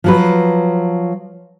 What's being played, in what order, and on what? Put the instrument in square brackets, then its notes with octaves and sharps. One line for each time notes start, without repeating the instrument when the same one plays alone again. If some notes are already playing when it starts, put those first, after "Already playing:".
[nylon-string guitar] F3 F#3 B4